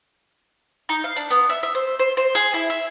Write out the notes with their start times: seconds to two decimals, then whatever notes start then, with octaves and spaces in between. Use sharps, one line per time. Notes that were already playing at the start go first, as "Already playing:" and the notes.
0.89 D#4
1.04 F5
1.16 D4
1.30 B3
1.49 E5
1.63 E5
1.75 C5
1.99 C5
2.17 C5
2.35 G#4
2.54 E4
2.70 E5